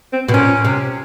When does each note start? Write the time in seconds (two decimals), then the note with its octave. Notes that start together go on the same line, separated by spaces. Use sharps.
0.13 C4
0.29 B2
0.33 A#2 C#4
0.64 C3